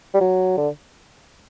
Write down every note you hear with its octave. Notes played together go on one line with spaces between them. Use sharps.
G3
F#3
D3